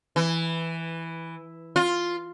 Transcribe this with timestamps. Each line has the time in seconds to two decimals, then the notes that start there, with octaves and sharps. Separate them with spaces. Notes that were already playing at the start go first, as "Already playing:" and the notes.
0.16 E3
1.76 F4